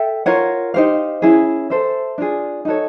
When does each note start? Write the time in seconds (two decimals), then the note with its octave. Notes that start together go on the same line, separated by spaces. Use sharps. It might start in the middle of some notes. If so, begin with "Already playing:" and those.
Already playing: A4 E5 G5
0.26 F4 A#4 C#5 F#5
0.74 D#4 G4 C5 F5
1.22 C#4 E4 G#4
1.70 A4 C5 E5
2.18 D4 F4 G#4
2.65 D#4 F#4 A4 C#5